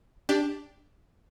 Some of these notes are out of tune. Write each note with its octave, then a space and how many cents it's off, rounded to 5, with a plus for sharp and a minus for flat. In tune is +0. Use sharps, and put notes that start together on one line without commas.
D4 -5 G4 +15